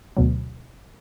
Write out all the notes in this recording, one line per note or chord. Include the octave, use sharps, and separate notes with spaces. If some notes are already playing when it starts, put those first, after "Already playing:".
D2 B2 F#3